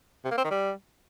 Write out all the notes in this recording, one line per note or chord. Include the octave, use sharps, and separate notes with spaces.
C3
A#3
C4
D#3
G3